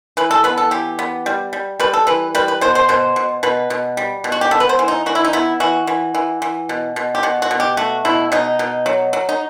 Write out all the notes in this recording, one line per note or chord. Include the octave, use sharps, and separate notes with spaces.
E3 B4
A4
B3 B4
A4
E3 G4
B3
G3
G3
G3 B4
A4
E3 B4
G3 B4
B4
B2 C5
C5
B2 C5
B2
B2 B4
B2
G3
B2
F#4
G4
B3 A4
B4
C5
E3
D#4
E3 F#4
E4
D#4
B3 E4
E3 F#4
E3
E3
E3
B2
B2
G4
B2 F#4
F#4
B2
G4
A3 F#4
B2 E4
B2 D#4
B2
F#3
F#3
D#4